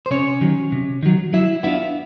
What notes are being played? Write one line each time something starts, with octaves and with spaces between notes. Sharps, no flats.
C5
C3 C#4 C#5
D#3 F#3
C3
D#3 F#3
F#3 E4 E5
B3 D4 E4 F4 E5